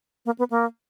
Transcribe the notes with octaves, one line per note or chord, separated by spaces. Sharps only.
A#3
B3
A#3